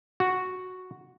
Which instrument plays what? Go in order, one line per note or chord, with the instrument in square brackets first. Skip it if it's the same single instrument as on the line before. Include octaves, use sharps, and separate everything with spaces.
[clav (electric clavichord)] F#4